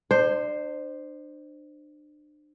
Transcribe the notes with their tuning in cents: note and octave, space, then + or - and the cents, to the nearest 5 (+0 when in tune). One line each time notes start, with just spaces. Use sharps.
D4 +35 C5 +0